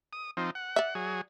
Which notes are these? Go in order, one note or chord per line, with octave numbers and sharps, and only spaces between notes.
D#6
F3 C4 D#4
F#5
D5 E5
F#3 G#4